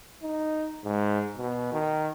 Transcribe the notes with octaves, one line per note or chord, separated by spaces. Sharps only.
D#4
G#2
B2
D#3